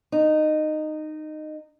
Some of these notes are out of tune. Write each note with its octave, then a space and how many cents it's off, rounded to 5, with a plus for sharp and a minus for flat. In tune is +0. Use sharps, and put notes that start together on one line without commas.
D#4 -15